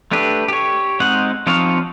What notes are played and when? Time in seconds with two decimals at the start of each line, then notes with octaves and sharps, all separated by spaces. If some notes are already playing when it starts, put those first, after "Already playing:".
0.11 A3 D4 G4 B4
0.48 G4 C#5
1.00 G#3 C4 D#4 F#5
1.47 F3 C4 D#4 C#5 F5